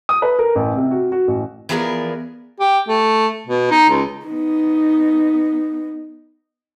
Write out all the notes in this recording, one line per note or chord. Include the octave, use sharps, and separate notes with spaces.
D#6
B4
A#4
A1
C3
F#4
F#4
A1
E3 F3 B3 G#4 A#4 D5
G4
A3
B2
D#4
C#2
B3 D#4